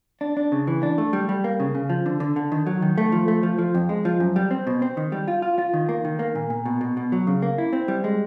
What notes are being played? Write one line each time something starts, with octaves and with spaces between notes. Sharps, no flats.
D4
D4
C#3
E3
D4
A3
G3
G3
A#3
C#3
C#3
F3
D3
D3
D3
D#3
F#3
D#3
A3
F3
A3
F3
F3
F2
G#3
F3
F#2
G3
C4
B2
C4
D#3
G3
F4
F4
F4
D#3
A#3
D#3
A#3
A#2
A#2
B2
B2
B2
F#3
C#3
A#3
E4
C4
G3
G#3